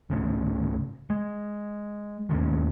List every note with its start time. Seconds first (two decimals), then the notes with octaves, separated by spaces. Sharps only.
0.10 G#1 C#2 A2 C#3
1.10 G#3
2.29 E1 D#2 G#2 C#3